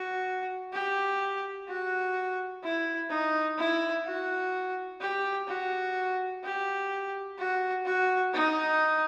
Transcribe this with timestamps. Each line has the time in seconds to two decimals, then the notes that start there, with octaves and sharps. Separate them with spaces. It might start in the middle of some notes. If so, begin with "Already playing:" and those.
Already playing: F#4
0.73 G4
1.68 F#4
2.63 E4
3.10 D#4
3.58 E4
4.05 F#4
5.01 G4
5.48 F#4
6.43 G4
7.38 F#4
7.85 F#4
8.34 D#4